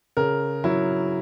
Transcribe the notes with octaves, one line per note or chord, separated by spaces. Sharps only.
C#3 A#4
F#3 E4